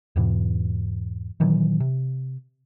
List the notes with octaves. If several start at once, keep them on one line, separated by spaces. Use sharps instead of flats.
E2 G#2 B2 E3
A#2 D#3 E3 F#3
C3